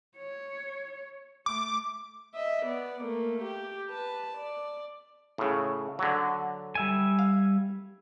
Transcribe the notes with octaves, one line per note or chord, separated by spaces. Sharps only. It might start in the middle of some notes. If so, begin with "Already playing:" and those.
C#5
A3 D6
D#5 E5
B3 D5
A3 A#3
G4
B4 A5
D5
A2 C#3
D3 F#3
G3 E5 G#5
F5